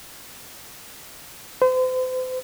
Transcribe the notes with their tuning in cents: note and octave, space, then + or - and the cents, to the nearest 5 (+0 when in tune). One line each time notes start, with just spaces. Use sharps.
C5 -40